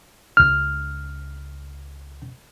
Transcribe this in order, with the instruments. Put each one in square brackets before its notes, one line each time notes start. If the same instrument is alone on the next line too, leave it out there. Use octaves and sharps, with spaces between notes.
[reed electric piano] C#2 F6